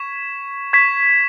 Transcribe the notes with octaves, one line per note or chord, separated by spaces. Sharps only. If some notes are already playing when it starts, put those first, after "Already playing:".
Already playing: C#6 G#6 B6 E7
C#6 G#6 B6 E7